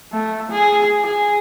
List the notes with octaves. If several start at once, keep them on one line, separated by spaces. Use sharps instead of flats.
A3
G#4
G#4